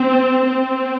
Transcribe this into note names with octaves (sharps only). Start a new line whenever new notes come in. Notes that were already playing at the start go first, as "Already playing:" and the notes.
Already playing: C4
C4